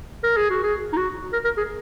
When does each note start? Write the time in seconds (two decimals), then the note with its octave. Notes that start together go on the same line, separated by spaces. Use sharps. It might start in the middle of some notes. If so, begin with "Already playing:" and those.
0.23 A#4
0.37 G#4
0.50 F#4
0.64 G#4
0.93 D#4
0.97 F#4
1.33 A#4
1.45 A#4
1.57 G#4